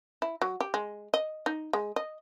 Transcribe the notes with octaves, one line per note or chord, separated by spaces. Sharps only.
E4
F#3
G4
G#3
D#5
D#4
G#3
D#5